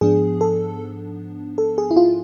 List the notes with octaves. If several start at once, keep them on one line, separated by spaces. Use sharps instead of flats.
G#2 F3 B3 D4 G#4
A4
A4
G#4
E4
F4